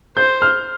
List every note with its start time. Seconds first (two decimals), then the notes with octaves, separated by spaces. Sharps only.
0.17 C5 G6
0.42 F6